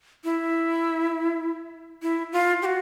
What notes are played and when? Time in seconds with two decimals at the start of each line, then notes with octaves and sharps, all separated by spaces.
0.24 E4
2.02 E4
2.32 F4
2.62 G4
2.65 F#4